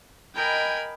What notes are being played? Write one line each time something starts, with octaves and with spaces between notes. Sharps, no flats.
A#4 B4 D#5 G5 G#5 B5